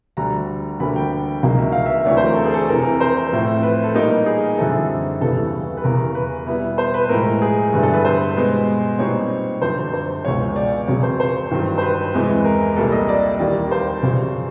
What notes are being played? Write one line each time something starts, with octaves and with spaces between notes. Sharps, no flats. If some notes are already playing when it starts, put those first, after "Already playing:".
D2 D3 G3 A#5
D2 D3 G3 A#3 B5
G5
C#2 C#3 F#3 A#3 D#4 F5
E5
F5
E5
D2 C3 E3 A3 D4 C#5
C5
A#4
A4
G#4
A4
F2 C3 E3 A#4
A#4
C5
A2 F3 A3 C4
B4
A4
A#2 G3 A#3 D#4 A#4
G#4
F#2 D3 G3 C4 E4 A4
D#2 C#3 E3 G3 B3 A4
B4
E2 C#3 E3 A#4
B4
B2 G3 B3 E4
C5
B4
A2 F3 G#3 A#4
G#4
G2 D3 G3 B3 E4
A4
B4
C5
B2 G#3 B3
A#2 G3 C4 D#4 C#5
F#2 D3 F3 C5
C5
C#2 B2 G#3 C#5
D5
F2 C#3 F#3 C#5
C5
C5
G2 D#3 F#3
C5
B4
E2 C3 E3 G#3
A#4
C2 A#2 G3 A#3 A4
D#5
D5
D#2 D#3 G3 A#3 D5
C5
F#2 C#3 F3